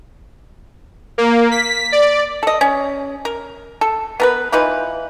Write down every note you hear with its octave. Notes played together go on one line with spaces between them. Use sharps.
A#3
B6
D5
A4 D#5
C#4
A#4
A4
B3 A#4 B4
E3 D#4 F4 B4